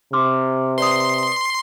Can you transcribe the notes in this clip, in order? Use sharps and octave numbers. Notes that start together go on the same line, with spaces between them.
C3 C6 D6 F6
B4 D5 C6 D#6 C7